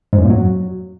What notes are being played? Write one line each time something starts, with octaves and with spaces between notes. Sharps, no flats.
G#2
F#2
A#2
F#3